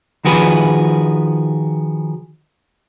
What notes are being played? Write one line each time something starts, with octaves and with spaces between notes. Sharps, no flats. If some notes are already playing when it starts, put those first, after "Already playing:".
D#3 F3 F#4 G#4 B4 B5